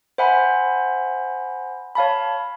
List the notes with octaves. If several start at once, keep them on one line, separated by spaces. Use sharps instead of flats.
C5 E5 F#5 G#5 B5
C#5 F5 A5 B5